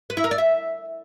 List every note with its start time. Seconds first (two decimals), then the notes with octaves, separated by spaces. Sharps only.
0.10 B4
0.17 E4
0.24 A#4
0.31 D5
0.38 E5